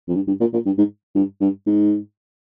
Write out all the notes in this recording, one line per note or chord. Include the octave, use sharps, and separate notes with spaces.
F2
G2
G2
A#2
A#2
G2
G#2
G2
G2
G#2